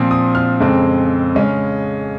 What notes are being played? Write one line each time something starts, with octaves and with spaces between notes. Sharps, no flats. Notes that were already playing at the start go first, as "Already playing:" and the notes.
Already playing: A#2 F3 C4
D#6
F6
F2 C#3 G#3 C4
C#3 G#3 C#4